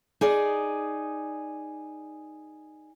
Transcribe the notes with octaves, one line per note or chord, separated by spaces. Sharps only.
D#4 G#4 D5